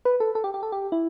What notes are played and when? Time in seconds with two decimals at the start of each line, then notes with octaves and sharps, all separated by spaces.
0.05 B4
0.20 A4
0.35 A4
0.44 G4
0.54 G4
0.63 A4
0.72 G4
0.92 E4